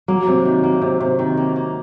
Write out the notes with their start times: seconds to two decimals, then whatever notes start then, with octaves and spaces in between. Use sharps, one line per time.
0.08 F#3 A#3
0.27 C3
0.45 D#3
0.64 A#3
0.82 C3
1.01 C3
1.19 D#3
1.37 A#3
1.56 A#3